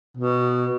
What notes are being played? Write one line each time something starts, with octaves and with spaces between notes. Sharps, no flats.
B2